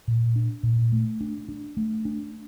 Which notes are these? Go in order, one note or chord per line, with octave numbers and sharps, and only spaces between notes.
A#2
D4
A#2
A3
D4
D4
A3
D4